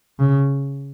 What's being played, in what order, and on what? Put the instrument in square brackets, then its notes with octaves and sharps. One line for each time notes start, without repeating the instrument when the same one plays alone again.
[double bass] C#3